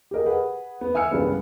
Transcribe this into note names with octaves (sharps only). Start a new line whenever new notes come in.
G4 G#4 A#4 D#5
G#4 B4 F#5
B3
E5 G#5 E6 F6 C#7
C2 G2 C#3 G3 G#3 B3